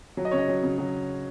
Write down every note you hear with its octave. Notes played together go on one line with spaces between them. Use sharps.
F#3
D#5
C#3 C#5
D#5
F#3
C#3
F#3